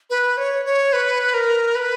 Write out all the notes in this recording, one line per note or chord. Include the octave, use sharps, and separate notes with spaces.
B4
C#5
C#5
B4
A#4
B4